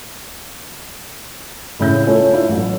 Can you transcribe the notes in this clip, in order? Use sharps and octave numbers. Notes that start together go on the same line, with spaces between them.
A2 C#3 E4 G6
A3 C#4 F4
D4 E4 F4 D5
A1 F#3